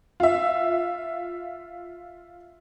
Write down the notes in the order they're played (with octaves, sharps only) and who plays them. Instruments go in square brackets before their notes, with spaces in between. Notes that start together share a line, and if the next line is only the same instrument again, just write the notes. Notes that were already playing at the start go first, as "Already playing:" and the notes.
[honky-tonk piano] F4 E5